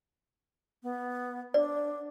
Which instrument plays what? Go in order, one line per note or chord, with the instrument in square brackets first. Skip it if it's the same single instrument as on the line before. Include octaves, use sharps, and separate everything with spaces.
[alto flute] B3
[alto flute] D4 [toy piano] D5